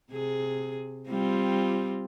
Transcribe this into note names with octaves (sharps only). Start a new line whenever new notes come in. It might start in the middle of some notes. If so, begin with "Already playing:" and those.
C3 G#4
G3 C4 F4